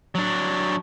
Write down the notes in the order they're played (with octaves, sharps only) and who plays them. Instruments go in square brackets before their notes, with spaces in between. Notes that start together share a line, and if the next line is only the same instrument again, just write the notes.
[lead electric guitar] F#3 D4